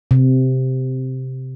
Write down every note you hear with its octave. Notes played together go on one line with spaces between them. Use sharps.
C3